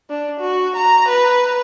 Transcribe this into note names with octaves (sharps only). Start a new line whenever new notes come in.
D4
F#4
A#5
B4